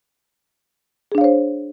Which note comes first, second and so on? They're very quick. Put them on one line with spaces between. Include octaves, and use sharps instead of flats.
G#4 D4 F5 C#5 C5